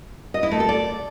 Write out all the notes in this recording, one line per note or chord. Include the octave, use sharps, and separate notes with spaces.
D#5
E4
A3
A4
D5